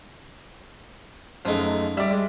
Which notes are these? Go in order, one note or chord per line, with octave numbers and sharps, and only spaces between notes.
F#2 F3 G#3 A3 D#4
G3 D5 E5
G#3